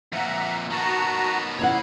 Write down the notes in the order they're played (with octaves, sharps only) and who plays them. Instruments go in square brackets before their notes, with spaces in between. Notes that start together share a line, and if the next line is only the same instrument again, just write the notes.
[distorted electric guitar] F2 A#2 [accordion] E5 F#5 A#5
[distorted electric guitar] D#3 B3 [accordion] F#4 A5 A#5
[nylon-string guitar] E2 E4 F#5 [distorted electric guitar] C#5 B5